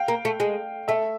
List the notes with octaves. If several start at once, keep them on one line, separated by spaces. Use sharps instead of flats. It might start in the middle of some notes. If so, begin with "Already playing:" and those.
Already playing: F5 G5
A#3
A3
G#3
A3 E5